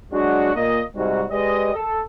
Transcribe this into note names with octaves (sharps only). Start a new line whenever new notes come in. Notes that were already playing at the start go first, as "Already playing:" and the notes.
F#3 G#3 D4 F#4
A#2 A#3 D#5
G#2 C3 G3 D#4 F#4
G#3 G4 B4 D5 D#5
A4